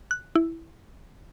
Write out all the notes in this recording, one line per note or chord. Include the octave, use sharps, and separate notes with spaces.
F#6
E4